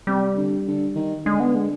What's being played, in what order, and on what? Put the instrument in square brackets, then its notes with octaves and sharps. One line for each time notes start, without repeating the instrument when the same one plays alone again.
[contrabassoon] C3 [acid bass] G3
[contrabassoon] D3
D3
D#3
[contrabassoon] D3 [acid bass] G#3
[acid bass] B3
G#3